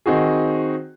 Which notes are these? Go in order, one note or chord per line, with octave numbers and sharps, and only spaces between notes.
D#3 C4 D#4 F#4 G#4